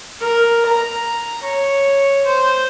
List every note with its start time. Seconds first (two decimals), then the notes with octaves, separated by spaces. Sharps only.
0.21 A#4
0.66 A#5
1.43 C#5
2.26 C5